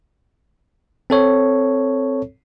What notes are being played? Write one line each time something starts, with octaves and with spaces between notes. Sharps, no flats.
C4 A4 C#5